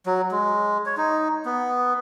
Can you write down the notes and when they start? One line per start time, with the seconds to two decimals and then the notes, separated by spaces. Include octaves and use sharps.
0.06 F#3
0.31 G#3
0.86 C#5
0.97 D#4
1.46 B3